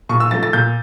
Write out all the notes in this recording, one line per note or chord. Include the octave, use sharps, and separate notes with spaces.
A#2 C#6
E6
F3 A3 A6
A6
A#2 G6